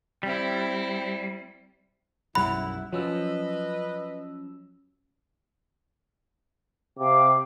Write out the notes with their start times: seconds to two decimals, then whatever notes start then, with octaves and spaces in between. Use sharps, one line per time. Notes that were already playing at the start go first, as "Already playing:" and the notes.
0.23 G3 C4 E4
2.35 B1 F#2 G3 E4 F#5 B5
2.93 F3 F#3 C#4 B4 D#5 E6
6.98 C3 F5 G5 D6